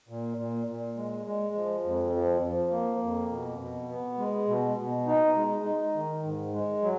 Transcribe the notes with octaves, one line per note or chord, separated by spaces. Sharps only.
A#2
A#2
A#2
G#3
G#3
F3
F2
F3
F3
A#3
F2
B2
B2
B3
G#3
B2
B2
D#4
G#3
D#4
D#3
G#2
G#3
F#3